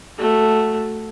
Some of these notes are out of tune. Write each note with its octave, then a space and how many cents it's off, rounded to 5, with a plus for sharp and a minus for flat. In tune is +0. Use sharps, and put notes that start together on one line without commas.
A3 +0 F#4 +0